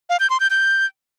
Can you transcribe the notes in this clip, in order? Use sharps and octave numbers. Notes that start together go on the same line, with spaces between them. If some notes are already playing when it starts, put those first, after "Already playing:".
F5
G6
C6
G6
G6